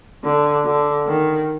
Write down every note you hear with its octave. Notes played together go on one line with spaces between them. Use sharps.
D3
D3
D#3